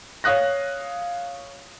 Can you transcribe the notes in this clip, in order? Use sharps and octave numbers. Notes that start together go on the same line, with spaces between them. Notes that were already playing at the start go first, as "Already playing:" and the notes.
C#5 F5 D#6 F#6 A#6